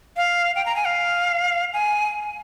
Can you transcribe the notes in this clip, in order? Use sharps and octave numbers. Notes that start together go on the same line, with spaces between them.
F5
G5
A#5
G#5
F5
G#5